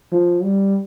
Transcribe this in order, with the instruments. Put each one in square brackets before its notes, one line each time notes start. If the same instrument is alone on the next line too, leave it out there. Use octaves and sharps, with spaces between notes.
[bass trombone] F3
G3